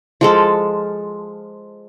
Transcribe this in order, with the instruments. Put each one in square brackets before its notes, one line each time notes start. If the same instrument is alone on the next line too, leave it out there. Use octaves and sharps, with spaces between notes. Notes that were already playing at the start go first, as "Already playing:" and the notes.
[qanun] F3 G#3 A4